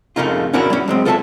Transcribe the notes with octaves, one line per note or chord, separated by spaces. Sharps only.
F2 C#3 A3 A#3 D#4 F4
C#4 D4 E4 F#4 A#4 C#5
G3 B3 C#4
F#3 G#3 C4
F4 A4 C5 D#5 E5 A5